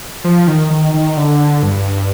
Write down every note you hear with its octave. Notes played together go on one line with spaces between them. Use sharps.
F3
D#3
D#3
D#3
D3
G2